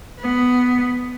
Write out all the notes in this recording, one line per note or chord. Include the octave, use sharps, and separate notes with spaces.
B3